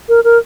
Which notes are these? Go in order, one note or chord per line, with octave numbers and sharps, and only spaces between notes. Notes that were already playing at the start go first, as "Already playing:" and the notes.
A#4
A#4